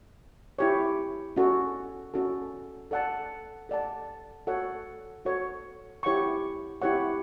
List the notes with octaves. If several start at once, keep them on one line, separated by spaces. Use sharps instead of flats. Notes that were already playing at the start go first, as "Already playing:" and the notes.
E4 G4 C#5
C#4 F#4 A4
C#4 F#4 A4
A4 D5 F#5 A5
A4 D5 F#5 A5
F#4 A4 C#5 F#5
F#4 A4 C#5 F#5
E4 G4 C#5 F#5 C#6
E4 G4 C#5 F#5 C#6